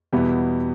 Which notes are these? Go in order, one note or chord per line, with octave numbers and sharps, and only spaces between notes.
E2 B2 G3 B3 E4